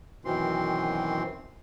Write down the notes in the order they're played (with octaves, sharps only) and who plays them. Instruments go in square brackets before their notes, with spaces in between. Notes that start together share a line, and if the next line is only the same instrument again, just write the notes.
[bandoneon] F#2 B2 D#3 E3 C4 C6